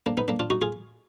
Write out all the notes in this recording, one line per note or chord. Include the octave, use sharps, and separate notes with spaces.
A#3 D4
B3 D#4
A#3 D4
D4 F4
D#4 F#4
F4 G#4